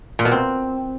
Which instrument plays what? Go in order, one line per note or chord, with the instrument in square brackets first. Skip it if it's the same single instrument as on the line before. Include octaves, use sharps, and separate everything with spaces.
[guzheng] A#2
B2
C4